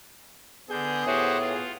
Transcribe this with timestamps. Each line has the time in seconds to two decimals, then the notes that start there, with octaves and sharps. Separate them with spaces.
0.70 D3 B3 G#4 G6
1.07 A2 F#4 G4 C5
1.40 F4